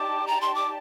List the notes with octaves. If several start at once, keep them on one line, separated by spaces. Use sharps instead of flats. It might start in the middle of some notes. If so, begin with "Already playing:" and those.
Already playing: D#4 G4 D5 A5 D6
A#5
C6
D6